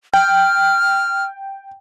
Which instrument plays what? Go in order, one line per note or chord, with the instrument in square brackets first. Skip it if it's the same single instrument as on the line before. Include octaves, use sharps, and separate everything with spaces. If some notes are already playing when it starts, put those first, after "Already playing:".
[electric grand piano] G5 [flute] F6